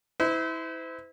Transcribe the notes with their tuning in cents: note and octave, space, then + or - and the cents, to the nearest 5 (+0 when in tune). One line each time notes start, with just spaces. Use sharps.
E4 -25 C5 -40